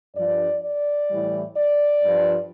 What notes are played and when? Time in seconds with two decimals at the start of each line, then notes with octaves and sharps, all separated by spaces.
0.16 G2 F3 D5
0.63 D5
1.10 A2 E3 G3
1.57 D5
2.04 G2 F3